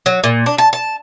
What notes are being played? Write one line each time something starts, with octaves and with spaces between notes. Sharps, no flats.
F#3
A#2
D4
A5
A5